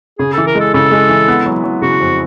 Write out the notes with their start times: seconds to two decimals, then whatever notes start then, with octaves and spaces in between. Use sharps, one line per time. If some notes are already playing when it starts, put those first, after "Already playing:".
0.19 C#3 G#4
0.33 A4
0.38 E3
0.46 A#4
0.55 G#3
0.60 A4
0.74 C#3 A4
0.91 G#3
1.09 E3
1.28 B3
1.46 F#3
1.64 F#3
1.82 C#3 F#4
2.00 F2